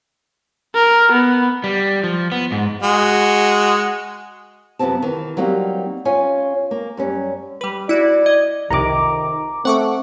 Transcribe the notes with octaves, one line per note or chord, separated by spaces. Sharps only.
A#4
B3
G3
F3
B3
G#2
G#3 F#4
F#2 C3 F3 B3 C4 A5
D#3 E3
F#3 G3 A#3 C4 D#4
C#4 F4 C#5 G#5
A#3
F#2 G3 C#4
G3 B4
E4 F#4 D5
D#5 G#6
C2 F2 C3 D#3 A#5 D6
A3 C4 F#5 C#6 D6